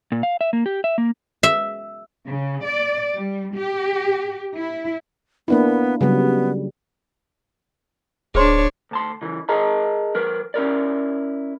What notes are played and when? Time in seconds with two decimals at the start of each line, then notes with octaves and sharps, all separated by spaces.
0.12 A#2
0.23 F5
0.41 E5
0.53 A#3
0.66 G4
0.84 E5
0.98 A#3
1.43 E5
2.26 C#3
2.64 D5
3.14 G3
3.55 G4
4.56 E4
5.48 A#3 B3 D4 E4
6.01 C#3 F#3 G3 B3
8.35 D1 D4 G#4 C5 C#5 C6
8.91 D2 A5 C6
9.22 C#3 E3
9.49 G#4 A#4 D#5 A5 A#5
10.15 F3 A#4 B4
10.54 C#4 E4 A#4 D5